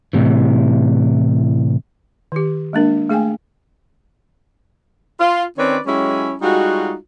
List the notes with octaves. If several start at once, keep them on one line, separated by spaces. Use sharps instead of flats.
A2 C3 E3
D#3 G4
G#3 A#3 D4 A#4
A3 G#4 F5 G5 G#5
F4
D#3 C4 C#4 B4 C#5 D5
F#3 G#3 C#4 E4 G4 C#5
G3 G#3 D#4 F4 F#4